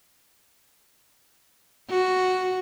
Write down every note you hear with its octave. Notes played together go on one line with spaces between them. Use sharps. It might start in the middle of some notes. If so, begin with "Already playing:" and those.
F#4